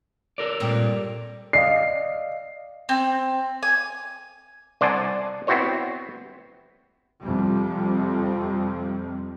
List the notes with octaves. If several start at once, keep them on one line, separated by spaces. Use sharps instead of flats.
A4 A#4 D5
G2 A#2 C4
D5 D#5 F5 C7
C4
G#5
C2 C5 D5 F#5 G#5 A5
B3 C4 E4 F#4 C5 C#5
F2 C3 G3